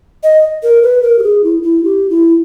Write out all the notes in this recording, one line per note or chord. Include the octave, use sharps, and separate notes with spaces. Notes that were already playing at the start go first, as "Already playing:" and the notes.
D#5
A#4
B4
A#4
G4
G#4
E4
E4
G4
E4